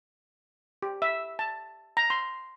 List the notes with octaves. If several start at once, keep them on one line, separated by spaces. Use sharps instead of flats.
G4
E5
A5
A#5
C6